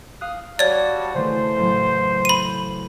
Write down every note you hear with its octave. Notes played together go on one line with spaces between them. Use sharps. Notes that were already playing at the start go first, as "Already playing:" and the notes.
F5 D#6 F#6
G3 F#4 C#5 D5 A5
C#3 E3 A3 C5
A1 F#3
B5 D#7